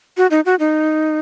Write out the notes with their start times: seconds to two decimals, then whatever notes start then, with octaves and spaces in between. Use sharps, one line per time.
0.17 F#4
0.31 D#4
0.46 F#4
0.59 D#4